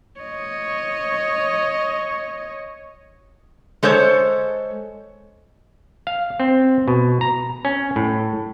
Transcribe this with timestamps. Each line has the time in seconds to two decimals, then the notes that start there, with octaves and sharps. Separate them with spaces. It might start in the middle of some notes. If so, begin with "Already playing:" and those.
0.20 C#5 D#5
3.83 G#3 A4 C5 C#5
6.07 F5
6.40 C4
6.88 B2
7.21 A#5
7.65 C#4
7.96 A2